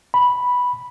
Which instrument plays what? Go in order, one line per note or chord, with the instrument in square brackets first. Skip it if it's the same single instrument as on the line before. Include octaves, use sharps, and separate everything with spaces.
[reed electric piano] B5